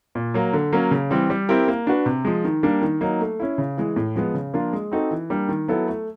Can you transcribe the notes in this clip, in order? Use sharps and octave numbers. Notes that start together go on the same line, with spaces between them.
A#2
F#3 A#3
D3
F#3 A#3 C#4
C#3
E3 G3 C4
G3
C4 E4 G4 A#4
A#3
D4 F#4 B4
C3
F3 G#3
D#3
G3 A#3 D4
D#3
F#3 A#3 D#4
A3
C#4 E4
C#3
E3 G#3
A2
F3 G#3 B3
C#3
F3 A#3 D4 F4
G#3
C4 D#4 F#4 A4
E3
G3 A#3 D4
D#3
F#3 B3 E4 A4
A3